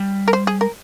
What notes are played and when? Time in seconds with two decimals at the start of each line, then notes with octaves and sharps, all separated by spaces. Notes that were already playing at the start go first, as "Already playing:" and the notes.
Already playing: G3
0.28 A#4
0.33 C5
0.47 G#4
0.61 A#4